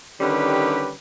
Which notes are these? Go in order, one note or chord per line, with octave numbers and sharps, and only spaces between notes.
D3 D#3 G3 C#4 G4 B4